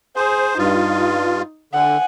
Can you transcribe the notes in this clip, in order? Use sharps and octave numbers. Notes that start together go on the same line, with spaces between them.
G#4 C5
G2 D#4 F4
D3 F#5 G#5